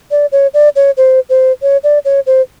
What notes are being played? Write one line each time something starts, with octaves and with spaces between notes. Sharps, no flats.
D5
C#5
D5
C#5
C5
C5
C#5
D5
C#5
C5